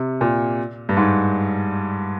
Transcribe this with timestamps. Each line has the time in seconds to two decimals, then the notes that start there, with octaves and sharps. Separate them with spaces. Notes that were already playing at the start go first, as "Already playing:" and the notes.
Already playing: C3
0.21 A#2
0.89 G2
0.97 G#2